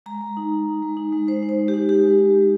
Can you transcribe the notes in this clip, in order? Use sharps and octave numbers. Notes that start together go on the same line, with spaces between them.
G#3 A#5
G#3
D#4
D#4
D#4
G#3
D#4
G#3
G#3 C5
D#4
C5
G#3
G4
D#4
G#3 G4
G#3
D#4
G#3